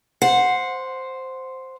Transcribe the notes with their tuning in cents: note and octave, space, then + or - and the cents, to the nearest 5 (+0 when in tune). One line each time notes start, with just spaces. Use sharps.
C5 +0 F#5 -20